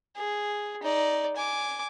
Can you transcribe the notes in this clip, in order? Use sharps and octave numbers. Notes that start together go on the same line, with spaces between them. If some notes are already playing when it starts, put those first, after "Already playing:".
G#4
D#4 D5
G#5 D6